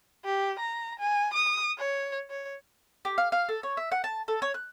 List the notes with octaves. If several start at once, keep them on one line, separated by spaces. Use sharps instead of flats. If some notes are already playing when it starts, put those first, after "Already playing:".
G4
A#5
G#5
D#6
C#5
C#5
G4
F5
F5
A4
C#5
E5
F#5
A5
A4
C#5
F#6